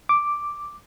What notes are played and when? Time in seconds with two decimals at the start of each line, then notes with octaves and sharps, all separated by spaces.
0.09 D6